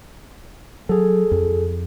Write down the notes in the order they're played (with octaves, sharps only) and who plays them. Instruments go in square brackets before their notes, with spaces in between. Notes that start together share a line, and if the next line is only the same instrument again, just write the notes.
[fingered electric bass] F#3 [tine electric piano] G#4 A4
[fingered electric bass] F2